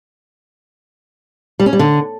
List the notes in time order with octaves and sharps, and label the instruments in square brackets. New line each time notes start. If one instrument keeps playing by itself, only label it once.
[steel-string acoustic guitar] G3
C#4
G3
D3